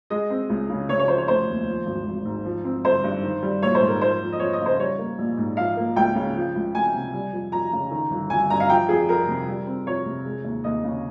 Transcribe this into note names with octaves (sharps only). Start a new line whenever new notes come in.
G#3 D#5
C4
C#2
C#3
C#3 C#5
C#5
F3 C5
C#5
F1 C5
D#2
F3
G#1
G#1
G#2
F3
C4
G1 C5
G2
D#3
G3
A#1 C#5
C5
G#2
A#4
F3 C5
F2
D#5
F2 C#5
D#5
C#3
C5
G3 C#5
A#3
A#1
G#2
F3 F5
A#3
C#2 G5
C#3
F3
C#2
C#2 G#5
C3
G3
F2
F2 A#5
C#3
D#3
G1
G1 G#5
G2 A#5
F5
F3 G5
F2 G#4
F2 A#4
C3
G3
C4
F2 C#5
C3
G#3
D#2
D#2 D#5
C#3